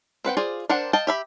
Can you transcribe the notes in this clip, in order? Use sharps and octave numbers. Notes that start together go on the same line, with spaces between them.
C4 B4 F#5 G5
F4 G#4 C5 D5
D4 A#4 C5 F#5 G5
D#5 F5 G5 A5
G4 E5 B5